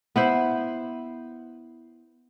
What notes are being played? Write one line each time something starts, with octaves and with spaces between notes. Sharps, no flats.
B3 E4 C5